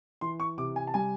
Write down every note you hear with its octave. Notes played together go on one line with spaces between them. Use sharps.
E3 C6
C#6
C3 D6
G#5
A5
G3 G#5